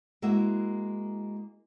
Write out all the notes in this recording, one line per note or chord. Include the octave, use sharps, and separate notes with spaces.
G#3 A#3 E4 F#4 E5